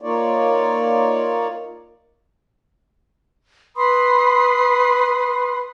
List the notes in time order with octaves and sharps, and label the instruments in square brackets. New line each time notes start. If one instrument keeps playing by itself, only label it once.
[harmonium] A#3 D#4 F4 C#5 D5
[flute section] B4 B5 C6 D#6